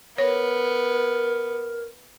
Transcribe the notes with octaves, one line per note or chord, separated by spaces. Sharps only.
B3 A#4 C#5